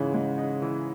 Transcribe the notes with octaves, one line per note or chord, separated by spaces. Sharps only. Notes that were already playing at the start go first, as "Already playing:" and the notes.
Already playing: G#2 C#3 E3
G#3
D#4
E3